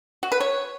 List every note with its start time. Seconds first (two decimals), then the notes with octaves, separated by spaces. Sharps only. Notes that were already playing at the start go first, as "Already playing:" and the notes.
0.23 F#4
0.32 B4
0.40 C#5